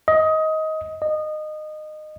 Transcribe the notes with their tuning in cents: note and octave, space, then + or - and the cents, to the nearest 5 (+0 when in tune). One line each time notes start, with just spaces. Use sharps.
D#5 +20
D#5 -20